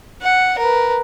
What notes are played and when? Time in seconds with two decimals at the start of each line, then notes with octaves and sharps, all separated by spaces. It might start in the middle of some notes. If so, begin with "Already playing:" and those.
0.22 F#5
0.58 A#4 B4